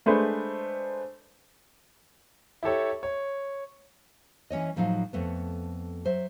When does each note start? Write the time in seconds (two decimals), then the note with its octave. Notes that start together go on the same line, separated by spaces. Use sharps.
0.06 G#3 A3 D4 B4 C5
2.63 E4 G4 A4 C#5
3.03 C#5
4.50 E3 C#4 C#5 D#5
4.76 A2 F3 F#3 D#4 F5
5.13 F2 A3 B3
6.05 F#3 C5 E5